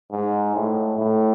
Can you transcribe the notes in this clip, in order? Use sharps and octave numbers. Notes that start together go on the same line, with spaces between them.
G#2
A2
A2